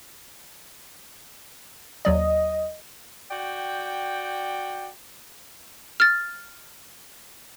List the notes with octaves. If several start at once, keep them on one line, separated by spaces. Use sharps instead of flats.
D#2 F#3 D5 D#5
F#4 D5 G5
F6 A6